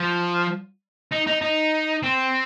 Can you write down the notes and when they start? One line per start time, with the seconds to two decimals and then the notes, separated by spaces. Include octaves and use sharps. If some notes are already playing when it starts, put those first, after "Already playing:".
Already playing: F3
1.12 D#4
1.27 D#4
1.42 D#4
2.03 C4